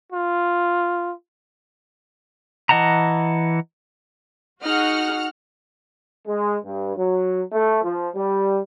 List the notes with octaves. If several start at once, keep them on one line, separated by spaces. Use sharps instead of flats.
F4
E3 D#5 F#5 A5 A#5
D#4 F#4 G#4 F#5 F6
G#3
G2
F#3
A3
F3
G3